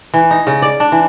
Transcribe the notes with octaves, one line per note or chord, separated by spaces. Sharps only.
E3
D#4
C#3
D5
D4
E3